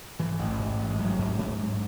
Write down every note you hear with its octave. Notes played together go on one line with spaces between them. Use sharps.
G#2 E3
A1
G#2
A1
G#3
A1 F#3
G#2
G#2
G#2